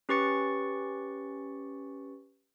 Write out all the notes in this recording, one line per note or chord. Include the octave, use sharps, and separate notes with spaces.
C#4 G4 B4 C#6 A6 C#7